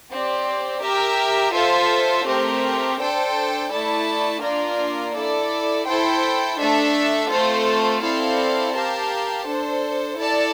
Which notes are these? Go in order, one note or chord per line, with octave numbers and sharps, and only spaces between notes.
C4 G4 D5
G4 A#4 E5
F4 A4 C5 E5
A3 C4 G4 A#4
D4 A4 C5 G5
A3 E4 A4 D5 A5
A#3 D4 F4 A#4 D5
E4 A4 D5
E4 A4 C5 G5
A3 D4 A4 E5
A3 C4 F4 A4 C5
C4 E4 A4 D5 F5
G4 A#4 F5 A5
D4 A4 C5
E4 A4 D5 A5